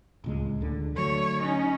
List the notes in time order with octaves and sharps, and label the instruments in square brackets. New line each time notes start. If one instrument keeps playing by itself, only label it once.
[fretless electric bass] D1 C#2 G#3
D2 D3
[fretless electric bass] D3 F#3 [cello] A3 C#5
[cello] C#4 D#4